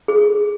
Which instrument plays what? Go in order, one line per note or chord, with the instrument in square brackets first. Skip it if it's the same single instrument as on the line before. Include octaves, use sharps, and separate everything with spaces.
[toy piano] G#4